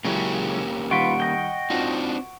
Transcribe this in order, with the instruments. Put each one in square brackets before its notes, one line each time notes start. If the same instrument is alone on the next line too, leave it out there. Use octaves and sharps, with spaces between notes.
[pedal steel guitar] C#3 [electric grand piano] F#3 G#3 E4 [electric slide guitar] A#3 C#4 G4
[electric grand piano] D#3 G3 [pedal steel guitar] F4 B4 [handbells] F#5 C#6 D7
[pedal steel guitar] D#5 G5
[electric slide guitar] C4 D4 D#4 [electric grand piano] F4 F#4